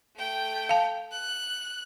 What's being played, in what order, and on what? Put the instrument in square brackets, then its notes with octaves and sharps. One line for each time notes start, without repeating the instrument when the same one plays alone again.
[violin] A3 G5
[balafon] F5 A5
[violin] F#6